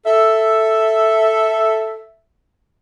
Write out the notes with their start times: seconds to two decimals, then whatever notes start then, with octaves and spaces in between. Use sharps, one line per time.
0.06 A4 E5